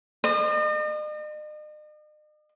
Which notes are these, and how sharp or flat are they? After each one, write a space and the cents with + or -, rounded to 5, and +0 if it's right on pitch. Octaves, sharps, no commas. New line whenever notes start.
D#5 -45